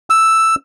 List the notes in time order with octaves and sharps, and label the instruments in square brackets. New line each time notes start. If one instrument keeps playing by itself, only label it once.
[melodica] E6